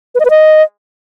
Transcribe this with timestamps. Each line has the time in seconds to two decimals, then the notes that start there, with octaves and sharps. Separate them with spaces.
0.15 B4
0.20 D#5
0.25 B4
0.30 D#5